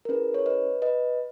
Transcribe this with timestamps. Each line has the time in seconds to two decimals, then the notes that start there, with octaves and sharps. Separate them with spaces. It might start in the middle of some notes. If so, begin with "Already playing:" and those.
0.05 A#4
0.09 C#4 E4 G#4 B4
0.34 C#5
0.46 B4 D#5
0.82 B4 D#5